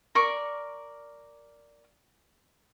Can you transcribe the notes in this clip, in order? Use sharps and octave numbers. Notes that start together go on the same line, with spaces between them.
A#4 D5 C#6